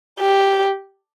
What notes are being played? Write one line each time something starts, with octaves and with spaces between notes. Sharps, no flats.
G4